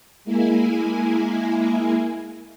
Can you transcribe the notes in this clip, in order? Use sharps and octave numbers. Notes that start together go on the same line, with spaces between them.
G#3 A#3 E4 G#5